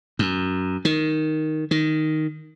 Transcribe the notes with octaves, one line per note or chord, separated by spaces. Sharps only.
F#2
D#3
D#3